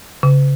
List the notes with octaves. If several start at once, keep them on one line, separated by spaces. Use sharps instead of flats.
C#3